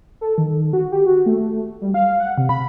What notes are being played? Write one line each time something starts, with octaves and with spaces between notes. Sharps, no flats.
A4
D#3
F#4
G4
F#4
A3
G3
F5
F#5
C3
B5